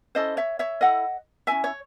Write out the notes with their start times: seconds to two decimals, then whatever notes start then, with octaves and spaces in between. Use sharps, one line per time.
0.15 C#4 E4 A4 C5 D#5
0.37 C#5 E5
0.59 C#5 E5
0.81 E4 A4 D#5 F#5
1.47 C#4 E4 A4 E5 G#5
1.64 C#5